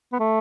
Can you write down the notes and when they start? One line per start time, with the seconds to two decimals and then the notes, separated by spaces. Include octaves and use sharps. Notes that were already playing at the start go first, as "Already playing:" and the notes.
0.13 B3
0.19 A3